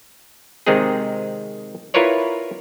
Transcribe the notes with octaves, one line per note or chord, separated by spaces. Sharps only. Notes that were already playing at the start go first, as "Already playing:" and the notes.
C3 D#3 G#3 C4 D#4 G#4
E4 F4 A#4 B4 C#5 D5